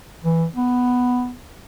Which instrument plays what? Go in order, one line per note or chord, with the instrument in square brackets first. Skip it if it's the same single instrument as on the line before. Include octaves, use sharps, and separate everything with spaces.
[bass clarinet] E3
B3